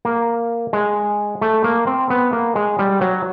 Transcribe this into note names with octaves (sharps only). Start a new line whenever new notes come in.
A#3
G#3
A3
A#3
C4
B3
A#3
G#3
G3
F#3